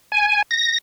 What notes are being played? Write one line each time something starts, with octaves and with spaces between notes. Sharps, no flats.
G#5
A#6